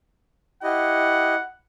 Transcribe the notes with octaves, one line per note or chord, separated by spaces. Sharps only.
E4 G4 D#5 F#5